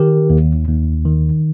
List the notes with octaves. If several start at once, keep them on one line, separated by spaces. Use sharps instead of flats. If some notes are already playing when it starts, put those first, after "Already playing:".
Already playing: D#3 G4 A#4
D#2
D#2
D#3